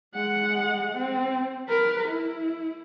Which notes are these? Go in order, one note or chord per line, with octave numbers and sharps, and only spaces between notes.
G#3 F#5
C4
A#4 B4
E4